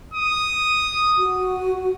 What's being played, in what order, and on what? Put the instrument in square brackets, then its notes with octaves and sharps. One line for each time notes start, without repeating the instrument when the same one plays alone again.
[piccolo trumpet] D#6
[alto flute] F#4